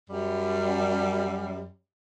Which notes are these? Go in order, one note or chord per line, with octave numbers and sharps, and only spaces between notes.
F#2 G3